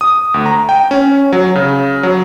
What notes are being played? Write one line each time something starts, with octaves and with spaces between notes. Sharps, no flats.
D#6
D2
A#5
G5
C#4
F#3
C#3
F#3